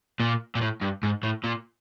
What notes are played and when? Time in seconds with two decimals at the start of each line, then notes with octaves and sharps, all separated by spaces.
0.20 A#2
0.55 A#2
0.61 A2
0.81 G2
1.03 G#2
1.23 A2
1.44 A#2